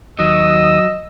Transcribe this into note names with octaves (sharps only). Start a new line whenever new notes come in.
D#2 F#3 D#5 D#6 E6